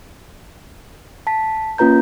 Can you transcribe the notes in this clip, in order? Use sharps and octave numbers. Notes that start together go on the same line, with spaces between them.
A5 B6
A#3 C#4 F4 B4 A#5 G6